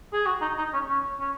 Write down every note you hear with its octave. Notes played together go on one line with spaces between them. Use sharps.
G#4
F#4
D#4
D#4
C#4
C#4
C#4